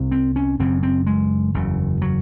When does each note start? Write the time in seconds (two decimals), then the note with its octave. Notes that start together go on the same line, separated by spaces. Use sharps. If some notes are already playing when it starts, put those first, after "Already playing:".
Already playing: C2 C3
0.12 C4
0.36 C#4
0.59 F#1 F#2 C#3 C4
0.83 C4
1.06 G#3
1.54 F#1 E2 C#3
2.02 F#3